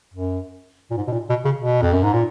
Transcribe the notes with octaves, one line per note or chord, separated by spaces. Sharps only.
F#2
A#2
G#2
B2
A#2
B2
C#3
B2
F2
F#2
G#2
A#2